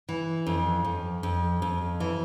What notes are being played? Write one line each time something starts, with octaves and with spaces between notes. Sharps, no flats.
E3
F2
F2
F2
F2
E3